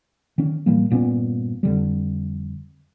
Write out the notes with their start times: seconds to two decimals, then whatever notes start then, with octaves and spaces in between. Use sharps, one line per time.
0.38 D#3 C#4
0.66 A2 E3 G3 A#3
0.90 G1 A#2 B3 C#4
1.63 F2 D3 G3